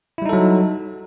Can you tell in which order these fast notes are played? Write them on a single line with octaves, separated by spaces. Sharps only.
E4 G3 D#4 A4 F#3